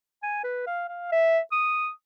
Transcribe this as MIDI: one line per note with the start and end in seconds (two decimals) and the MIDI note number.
0.23 0.42 80
0.44 0.67 71
0.67 0.84 77
0.88 1.09 77
1.12 1.39 76
1.52 1.90 87